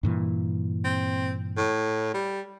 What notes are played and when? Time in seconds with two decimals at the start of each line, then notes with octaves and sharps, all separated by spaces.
0.03 G2 A#2 E3
0.85 C4
1.57 A2
2.14 G3